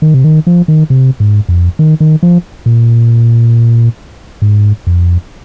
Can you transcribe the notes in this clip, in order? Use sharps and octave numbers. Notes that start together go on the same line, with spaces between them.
D#3
C3
D#3
F3
D#3
C3
G#2
F2
D#3
D#3
F3
A#2
G#2
F2